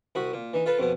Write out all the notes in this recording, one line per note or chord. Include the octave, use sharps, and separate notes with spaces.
C2 F#4 B5 D#6
A#2
E3 D#4
F4 A4 B4
F2 B2 B3